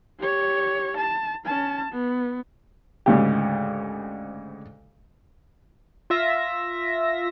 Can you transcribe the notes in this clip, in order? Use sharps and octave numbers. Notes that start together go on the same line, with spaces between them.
G4 C#5
A5
C#4 A5
B3
D2 G#2 C#3 G4
F4 E5 A#6